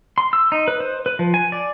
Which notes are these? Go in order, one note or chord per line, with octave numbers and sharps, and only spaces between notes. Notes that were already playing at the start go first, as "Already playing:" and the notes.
C6
E6
D#4
B4
C5
B4
F3
G#5
D5